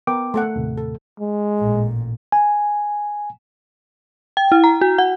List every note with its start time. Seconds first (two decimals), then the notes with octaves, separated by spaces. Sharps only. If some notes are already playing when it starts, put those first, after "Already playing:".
0.07 B3 A#4 G5 D6
0.34 A3 A4 F#5
0.56 D#2 A2 C3
0.78 A4
1.20 G#3
1.59 A1 A#2
2.32 G#5
4.37 G5
4.52 E4
4.64 A#5
4.81 F#4
4.98 F#5